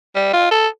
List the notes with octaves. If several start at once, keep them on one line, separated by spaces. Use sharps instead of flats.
G3
F4
A4